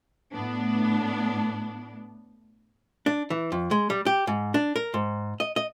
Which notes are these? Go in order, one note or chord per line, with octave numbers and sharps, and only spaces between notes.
A2 B3 D4
D4
E3
F2
G#3
G3
G4
G#2
D4
A#4
G#2
D#5
D#5